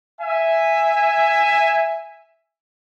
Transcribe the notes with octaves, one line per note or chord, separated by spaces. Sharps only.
E5 G#5